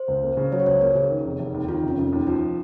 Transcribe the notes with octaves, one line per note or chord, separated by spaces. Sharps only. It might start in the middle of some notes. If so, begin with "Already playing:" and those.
Already playing: C5
C#2
A#3
C#3
F#3 C#5
C5
C#2 C#5
A#3 A#4
C#3 G#4
D#3
F1
F1
D#2
D#3 F4
F1 C#4
F1
D#2 D#4
F3 D#4